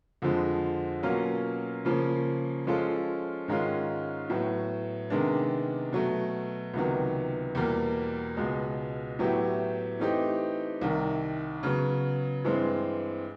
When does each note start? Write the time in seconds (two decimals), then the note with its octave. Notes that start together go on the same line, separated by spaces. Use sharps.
0.22 F2 D3 F3 G#3
1.03 B2 F#3 A#3 C#4 F4
1.85 C#3 F3 A#3 C#4
2.67 F3 G#3 C#4 F4 A4
3.48 G#2 D#3 G#3 C#4 F4
4.30 A2 F#3 B3
5.10 C3 D#3 G#3 B3 D4
5.92 B2 F#3 A3
6.74 C#2 C3 D#3 F#3 B3
7.55 E2 B2 G3 A#3
8.37 C#2 B2 G#3
9.19 A2 F#3 B3 E4 G4
10.00 E3 A3 C4 D#4 G4
10.81 C2 C3 D#3
11.63 C#3 F#3 B3
12.45 G2 E3 G#3 C4